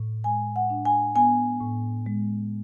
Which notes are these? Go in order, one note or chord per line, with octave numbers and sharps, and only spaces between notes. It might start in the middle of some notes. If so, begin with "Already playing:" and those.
Already playing: A2
G#3 G#5
F#5
D4
G#5
B3 G#5
A2
G#3